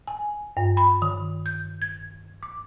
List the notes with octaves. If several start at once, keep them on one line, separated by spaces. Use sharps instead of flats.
G#5
G2
B5
D#3
G6
G#6
D6